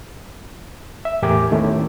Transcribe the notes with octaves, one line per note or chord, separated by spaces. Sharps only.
E5
E2 A2 G4 A#4 G#5 D6
D#3 A3 B3 C#4 E4